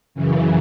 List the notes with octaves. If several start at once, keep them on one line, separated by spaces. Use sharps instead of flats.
F#2 C#3 E3